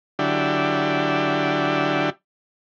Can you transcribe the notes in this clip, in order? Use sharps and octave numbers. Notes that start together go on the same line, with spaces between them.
D3 F#3 D4 E4 G4